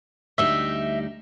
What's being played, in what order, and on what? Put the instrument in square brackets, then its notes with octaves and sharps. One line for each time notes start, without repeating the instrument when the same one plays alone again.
[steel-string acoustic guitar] D2 G3 D#4 [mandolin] E5